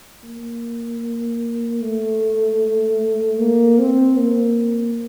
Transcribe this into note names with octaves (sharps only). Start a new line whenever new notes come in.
A#3
A3
A#3
C4
A#3